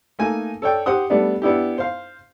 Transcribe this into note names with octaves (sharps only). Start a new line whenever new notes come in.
A3 A#3 D#4 G#5
A4 C#5 D5 G5
G4 C5 F#5 D#6
G3 A3 B3 D4
B3 D4 E4 G4
C5 F5